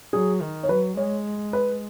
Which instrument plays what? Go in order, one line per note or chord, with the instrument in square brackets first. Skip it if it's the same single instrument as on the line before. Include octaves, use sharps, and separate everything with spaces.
[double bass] F#3 [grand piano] G#4
[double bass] D#3
[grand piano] C#5
[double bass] F#3 [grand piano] B4
[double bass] G#3 [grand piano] C#5
[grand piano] B4